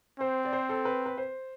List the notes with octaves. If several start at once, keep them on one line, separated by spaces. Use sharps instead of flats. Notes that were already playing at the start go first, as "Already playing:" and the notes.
C4 C5
D5
C5
A4
B4
B4
C5